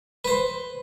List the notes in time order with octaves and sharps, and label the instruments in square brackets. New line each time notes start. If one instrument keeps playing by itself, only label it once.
[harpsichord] B4 C5